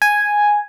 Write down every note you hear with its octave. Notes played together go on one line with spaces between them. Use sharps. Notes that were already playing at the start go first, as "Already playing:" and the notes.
G#5